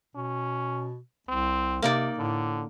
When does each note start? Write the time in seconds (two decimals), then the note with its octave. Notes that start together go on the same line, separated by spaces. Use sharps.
0.16 B2 C#4
1.28 C2 C4
1.82 C3 A#3 D#4 D5
2.18 A2 D3